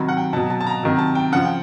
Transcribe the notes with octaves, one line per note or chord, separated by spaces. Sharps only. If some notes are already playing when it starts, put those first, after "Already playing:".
Already playing: C3 D#3 F#3 B5
F#5
G5
B2 F#3 A5
A5
A5
A#5
C3 D#3 F#3
A5
G5
C#3 F3 F#5
G5